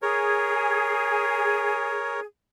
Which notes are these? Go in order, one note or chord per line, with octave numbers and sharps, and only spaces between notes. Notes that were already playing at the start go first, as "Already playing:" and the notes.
G#4 A#4 C#5